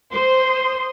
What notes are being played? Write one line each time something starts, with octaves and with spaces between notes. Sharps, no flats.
C5 C6 D#6